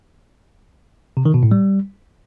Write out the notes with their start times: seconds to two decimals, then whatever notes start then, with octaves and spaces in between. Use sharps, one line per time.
1.17 C3
1.25 D#3
1.34 B2
1.43 A2
1.51 G3